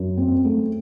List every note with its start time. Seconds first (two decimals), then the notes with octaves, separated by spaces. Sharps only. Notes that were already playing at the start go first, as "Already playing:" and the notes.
Already playing: F#2
0.17 C4
0.45 A3